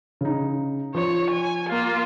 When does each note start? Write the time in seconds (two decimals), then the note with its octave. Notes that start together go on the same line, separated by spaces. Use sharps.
0.21 C#3 D#4
0.95 F3 C#5
1.30 G#5
1.69 A#3 F4